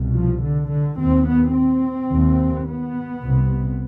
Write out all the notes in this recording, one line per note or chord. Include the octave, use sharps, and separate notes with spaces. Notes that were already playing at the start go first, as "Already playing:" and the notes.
Already playing: C2 B2
F3
D3
D3
D#2 C4
B3
C4
D#2
B3
C2 C3